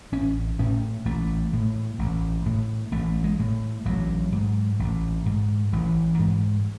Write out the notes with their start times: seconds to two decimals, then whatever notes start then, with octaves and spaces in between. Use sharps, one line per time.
0.12 A1 C#4
0.59 A2 C#4
1.05 A1 A3
1.53 A2
1.99 A1
2.46 A2
2.92 A1 A3
3.24 G#3
3.39 A2
3.85 A1 F#3
4.32 G#2
4.79 A1
5.26 G#2
5.73 A1 E3
6.19 G#2